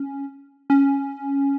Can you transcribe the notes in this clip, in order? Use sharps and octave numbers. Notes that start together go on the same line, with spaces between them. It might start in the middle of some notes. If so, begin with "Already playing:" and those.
Already playing: C#4
C#4